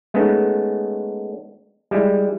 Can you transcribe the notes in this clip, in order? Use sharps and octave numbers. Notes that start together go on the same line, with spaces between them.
G#3 A3 B3 C#4 D#4
G3 G#3 E4